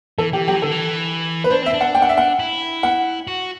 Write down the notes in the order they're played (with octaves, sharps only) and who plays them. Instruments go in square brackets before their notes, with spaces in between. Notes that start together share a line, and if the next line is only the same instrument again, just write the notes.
[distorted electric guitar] E3 [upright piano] A4
[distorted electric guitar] E3 [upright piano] G4
[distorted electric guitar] F#3 [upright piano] G4
[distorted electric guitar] E3
[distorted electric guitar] D3 [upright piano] A4
[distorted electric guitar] E3
[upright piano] B4
[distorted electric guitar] D4 [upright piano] C5
[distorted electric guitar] C4 [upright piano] E5
[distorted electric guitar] D4
[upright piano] F#5
G5
F#5
E5
F#5
[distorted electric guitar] E4
[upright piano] F#5
[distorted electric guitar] F#4